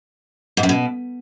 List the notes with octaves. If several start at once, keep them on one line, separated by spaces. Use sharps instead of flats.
G#2
F#2
B2